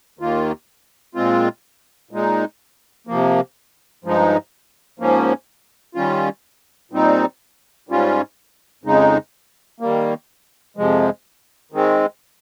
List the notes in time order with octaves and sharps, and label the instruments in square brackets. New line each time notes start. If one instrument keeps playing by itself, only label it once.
[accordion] D#2 D#3 A#3 F4
A#2 G#3 C4 F4
A#2 G#3 D#4
C3 F3 A#3
G2 F3 G#3 D#4
G#2 F3 A#3 C#4
D#3 G3 C#4 F4
A#2 G3 C4 D#4
G#2 G3 C#4 F4
F2 C#3 G#3 D#4
D#3 G3 A#3
F2 C3 F3 G#3
D#3 G#3 C4